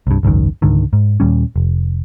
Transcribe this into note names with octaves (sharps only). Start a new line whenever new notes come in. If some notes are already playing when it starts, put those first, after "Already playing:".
C2 G2
G#1 C#2 F#2 D#3
C#2 G#2 D3 D#3
G#2
D#2 A#2 G3 C#4
F1